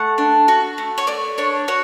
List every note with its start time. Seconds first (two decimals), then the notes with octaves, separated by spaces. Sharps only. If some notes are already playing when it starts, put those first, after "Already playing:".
Already playing: A3 F#5
0.18 D4
0.48 F#4
0.78 A3
0.98 C#5
1.07 A3 D5
1.38 D4 C#5
1.68 F#4 C#5